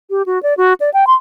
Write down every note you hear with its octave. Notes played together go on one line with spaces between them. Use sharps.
G4
F#4
D5
F#4
D5
G5
C6